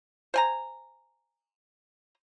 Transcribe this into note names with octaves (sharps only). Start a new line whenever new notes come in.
C5 G#5 A#5